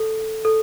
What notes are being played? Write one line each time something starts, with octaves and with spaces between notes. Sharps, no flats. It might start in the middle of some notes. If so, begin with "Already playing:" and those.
Already playing: A4
A4